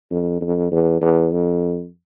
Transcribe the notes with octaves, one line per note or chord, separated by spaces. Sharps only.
F2
F2
E2
E2
F2